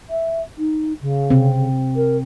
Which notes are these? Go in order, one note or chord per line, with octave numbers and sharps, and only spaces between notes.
E5
D#4
C#3
C3 C4
A#4